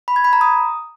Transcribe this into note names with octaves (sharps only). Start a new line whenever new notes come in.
B5
G#6
B5
A#5
D#6